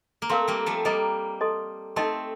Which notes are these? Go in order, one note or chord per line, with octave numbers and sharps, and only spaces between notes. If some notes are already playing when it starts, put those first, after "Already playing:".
A#3
A3 C4 A#4 F5 C6
G3 A#3
F3 A3
G3 A#3 A4 D#5 A#5
A4 D#5 A5 C6
A3 C4 D#4 A4 D#5 A5 C6